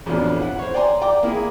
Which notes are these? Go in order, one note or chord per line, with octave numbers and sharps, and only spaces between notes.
A1 F2 B2 D4
E4 F#5
C5 C#5
D5 G5 G#5 A#5 C6
D5 G5 A#5 D6
A#3 E4 G#4